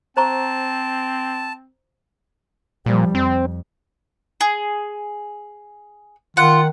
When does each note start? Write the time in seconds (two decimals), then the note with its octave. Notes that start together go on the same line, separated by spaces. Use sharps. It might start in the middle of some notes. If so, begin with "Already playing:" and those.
0.17 C4 C5 A5 A#5 C#6
2.86 A#2 F3 G3
3.15 F2 C4
4.41 G#4
6.37 D#3 F4 F#5